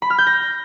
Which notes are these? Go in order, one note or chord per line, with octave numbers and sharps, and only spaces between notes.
B5
F6
G6
A#6